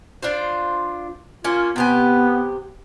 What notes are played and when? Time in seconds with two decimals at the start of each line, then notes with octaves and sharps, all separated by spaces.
0.22 D4 F4 C5
1.44 A#3 C#4 F4
1.76 C3 B3 G4 G#5